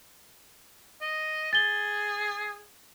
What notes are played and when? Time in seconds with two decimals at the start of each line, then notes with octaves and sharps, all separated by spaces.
1.01 D#5
1.53 G#4 A6 G7